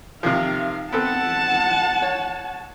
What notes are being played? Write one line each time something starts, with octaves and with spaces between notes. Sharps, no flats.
C3 D#3 F3 F5
B3 C4 A4 F#5 A5
C#5